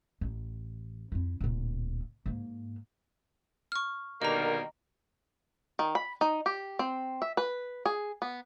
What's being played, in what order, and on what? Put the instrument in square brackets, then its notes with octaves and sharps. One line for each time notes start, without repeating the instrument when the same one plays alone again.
[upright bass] A1
F2 E4
D1 A#2
G#2 A#3
[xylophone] C#6 F6
[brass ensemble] B2 D3 D#3 [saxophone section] G3 A#3 [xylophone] D#5 A#5
[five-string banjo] D#3
B5
D#4
G4
C4
E5
B4
G#4
B3